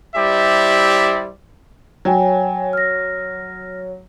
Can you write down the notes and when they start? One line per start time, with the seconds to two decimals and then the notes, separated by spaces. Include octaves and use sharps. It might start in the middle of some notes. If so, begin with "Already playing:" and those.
0.16 G3 E4 G4 C5 D5 E5
2.05 F#3 C#5 G5 G#5
2.73 F6 A#6